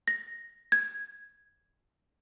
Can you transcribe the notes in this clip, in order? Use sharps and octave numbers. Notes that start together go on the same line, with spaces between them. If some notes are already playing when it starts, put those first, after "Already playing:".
A#6
G#6